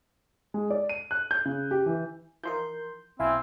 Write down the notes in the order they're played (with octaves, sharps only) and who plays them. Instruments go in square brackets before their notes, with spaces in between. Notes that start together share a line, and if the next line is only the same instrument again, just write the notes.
[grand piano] G#3
D5
D#7
F#6
G6
C#3
G4
E3
[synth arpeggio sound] E3 F3 D#4 [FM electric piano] A#4 C6 G6
[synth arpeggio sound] B1 [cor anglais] C4 [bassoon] E4 [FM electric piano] F5 G#5